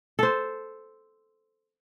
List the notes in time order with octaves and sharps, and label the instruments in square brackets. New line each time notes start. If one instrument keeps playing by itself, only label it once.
[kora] A4 C5